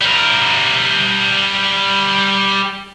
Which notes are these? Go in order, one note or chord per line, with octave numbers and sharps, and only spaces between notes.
G3 A#4